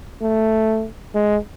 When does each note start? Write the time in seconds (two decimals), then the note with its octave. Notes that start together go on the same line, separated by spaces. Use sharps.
0.22 A3
1.14 G#3